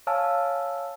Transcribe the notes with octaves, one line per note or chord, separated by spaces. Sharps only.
C#5 F5 G#5 A5 E6 F6